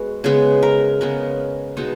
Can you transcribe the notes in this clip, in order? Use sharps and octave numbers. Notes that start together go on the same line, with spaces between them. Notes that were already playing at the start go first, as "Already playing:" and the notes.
Already playing: G#3 B3 F#4
C#3 G#3 B3 G#4
A#4
C#3 G#3 B3 A#4
B2 G#3 B3 D#4